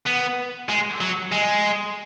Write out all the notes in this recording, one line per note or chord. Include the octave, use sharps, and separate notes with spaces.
B3
G#3
F#3
G#3